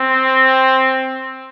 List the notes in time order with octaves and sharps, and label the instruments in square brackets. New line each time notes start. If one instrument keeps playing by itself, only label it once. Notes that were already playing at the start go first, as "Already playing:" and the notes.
Already playing: [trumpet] C4